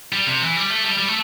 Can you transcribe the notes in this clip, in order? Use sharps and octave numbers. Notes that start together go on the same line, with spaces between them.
G3
C3
E3
G3
A3
G3
G3
A3